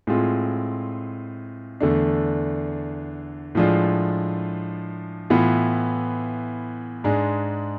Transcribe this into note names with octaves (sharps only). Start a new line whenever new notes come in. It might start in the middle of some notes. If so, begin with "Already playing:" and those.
A2 G#3 C4 F4
E2 D3 A3 D4
A2 F3 G#3 D4 F4
A2 E3 B3 F4
G#2 G#3 D4